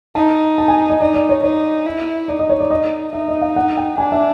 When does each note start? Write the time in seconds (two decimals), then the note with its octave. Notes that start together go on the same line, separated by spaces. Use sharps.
0.15 D#4 A5
0.58 A5
0.68 G#5
0.90 D#5
1.01 D#4 D5
1.14 D5
1.29 C#5
1.44 D#4 C#5
1.86 E4
2.28 D#4 D5
2.39 D#5
2.49 C#5
2.60 D5
2.71 D#5
3.13 D#4 E5
3.28 D#5
3.42 F5
3.56 F#5
3.77 G5
3.98 D4 G#5
4.12 E5